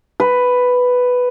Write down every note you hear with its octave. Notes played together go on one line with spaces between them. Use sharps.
B4